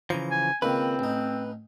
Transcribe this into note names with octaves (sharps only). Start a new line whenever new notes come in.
C#3 E3 F3 A#5
G#5
C#2 D#3 A#3 C4 B4
A1 D#4